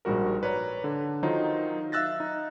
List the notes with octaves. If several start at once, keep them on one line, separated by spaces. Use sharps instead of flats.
A#1 G#2 G3 F#4 A#4
B4 C#5 D5 A#5
D3
D#3 F#3 D#4 F4 A#4 C5
E5 F5 E6 F#6 A6 A#6
D#4